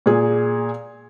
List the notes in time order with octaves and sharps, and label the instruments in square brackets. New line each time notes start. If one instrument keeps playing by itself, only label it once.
[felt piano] A#2 G#4